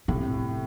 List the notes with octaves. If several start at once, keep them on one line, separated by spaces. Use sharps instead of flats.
A2 C3